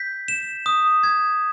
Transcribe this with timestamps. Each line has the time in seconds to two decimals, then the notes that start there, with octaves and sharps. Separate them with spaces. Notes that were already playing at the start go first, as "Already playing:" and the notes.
Already playing: G6 B6
0.28 E7
0.66 D#6
1.03 G#6